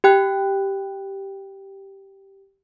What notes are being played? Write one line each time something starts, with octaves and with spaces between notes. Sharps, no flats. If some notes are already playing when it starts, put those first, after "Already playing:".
G4 G5 F#6